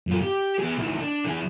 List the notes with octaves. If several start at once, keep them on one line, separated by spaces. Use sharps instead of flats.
F#2 F4
G4
B3 G#4
D2 E3
D4
E3 G#4